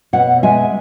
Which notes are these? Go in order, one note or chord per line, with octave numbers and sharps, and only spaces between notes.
B2 C#5 F#5
G#3 E5 G#5